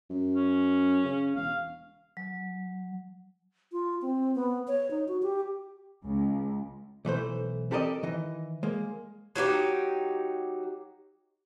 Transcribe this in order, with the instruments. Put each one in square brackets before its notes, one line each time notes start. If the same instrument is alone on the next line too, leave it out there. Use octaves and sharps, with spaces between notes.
[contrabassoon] F#2
[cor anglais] C#4
[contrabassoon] C#3
[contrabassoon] E1 [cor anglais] F5
[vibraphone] F#3
[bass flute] F4
C4
B3
C#5
D#4
F#4
G4
[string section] C#2
[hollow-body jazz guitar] B1 E3 A3 C5
C4 G4 A4 A#4 D5 D#5
D#3 E3 D#5
G#3 A#3
[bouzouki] F#3 D#4 E4 G4